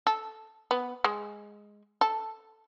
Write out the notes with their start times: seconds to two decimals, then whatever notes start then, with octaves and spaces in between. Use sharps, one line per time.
0.07 A4
0.71 B3
1.04 G#3
2.01 A4